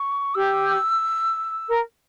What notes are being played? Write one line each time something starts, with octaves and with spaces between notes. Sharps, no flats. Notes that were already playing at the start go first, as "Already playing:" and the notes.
Already playing: C#6
G4 E6
A#4